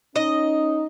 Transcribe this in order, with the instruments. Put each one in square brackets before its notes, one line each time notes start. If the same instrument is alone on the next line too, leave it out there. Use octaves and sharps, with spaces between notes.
[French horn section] C#4 D#4 [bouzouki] D#5